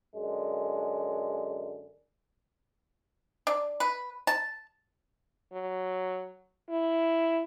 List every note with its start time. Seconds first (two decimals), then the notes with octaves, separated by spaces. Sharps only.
0.15 F#2 D3 G#3
3.47 D4
3.80 B4
4.27 A5
5.53 F#3
6.70 E4